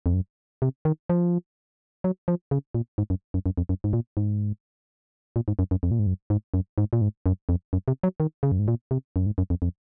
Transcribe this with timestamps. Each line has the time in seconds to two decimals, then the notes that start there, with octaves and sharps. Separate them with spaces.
0.06 F2
0.14 F#2
0.62 C3
0.85 D#3
1.10 F3
2.04 F#3
2.28 F3
2.51 C#3
2.75 A#2
2.98 G#2
3.10 F#2
3.34 F#2
3.46 F#2
3.58 F2
3.69 F#2
3.84 G#2
3.93 A#2
4.17 G#2
5.36 A#2
5.48 G#2
5.59 F#2
5.71 F#2
5.83 F2
5.91 A#2
5.99 G#2
6.07 F#2
6.30 G#2
6.54 F#2
6.78 G#2
6.93 A#2
7.01 G#2
7.26 F#2
7.49 F2
7.73 F#2
7.88 C3
8.03 F#3
8.20 D#3
8.43 C#3
8.52 F#2
8.59 G#2
8.68 A#2
8.91 C3
9.16 F#2
9.26 G#2
9.38 F#2
9.50 F2
9.62 F2